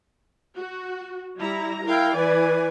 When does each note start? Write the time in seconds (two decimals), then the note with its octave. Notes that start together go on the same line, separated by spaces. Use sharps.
0.57 F#4
1.38 G3 E4 A#5
1.86 E4 A#4 F5 G5
2.16 E3 B4 D5 G#5